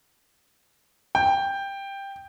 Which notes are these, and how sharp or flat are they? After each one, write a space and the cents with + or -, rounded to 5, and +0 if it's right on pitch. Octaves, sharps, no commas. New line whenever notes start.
G5 +10